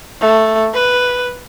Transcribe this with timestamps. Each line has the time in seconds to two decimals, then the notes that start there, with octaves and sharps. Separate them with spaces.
0.21 A3
0.74 B4